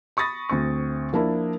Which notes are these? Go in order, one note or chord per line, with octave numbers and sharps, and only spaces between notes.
B5 C#6 D#6 A6 A#6
D2 C4 C#6
F3 A#3 D4 E4